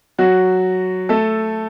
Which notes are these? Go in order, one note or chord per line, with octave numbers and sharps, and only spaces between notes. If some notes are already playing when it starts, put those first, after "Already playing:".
F#3 F#4
A3 A4